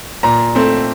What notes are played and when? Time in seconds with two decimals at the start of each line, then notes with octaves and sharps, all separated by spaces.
0.23 A#2 A#5
0.55 A3 C4